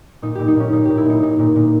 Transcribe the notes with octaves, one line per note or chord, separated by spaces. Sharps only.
A#2 D#4
A#2 G4
D#4
A#2 C#4
A#2 D#4
A#2 G4
E4
A#2 D#4
A#2 D#4
A#2
A#2